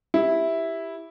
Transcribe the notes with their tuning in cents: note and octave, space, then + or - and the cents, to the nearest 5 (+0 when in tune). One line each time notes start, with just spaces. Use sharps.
E4 -5 G4 +0